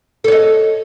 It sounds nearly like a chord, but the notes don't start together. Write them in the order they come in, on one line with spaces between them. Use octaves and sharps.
A4 C#5 D#5